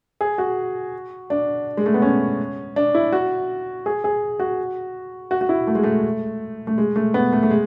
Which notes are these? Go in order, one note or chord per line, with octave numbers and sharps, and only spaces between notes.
G#4
F#4
D4
G#3
A3
B3
C#4
D4
E4
F#4
G#4
G#4
F#4
F#4
F#4
E4
A3
G#3
A3
A3
G#3
A3
B3
A3
A3
G#3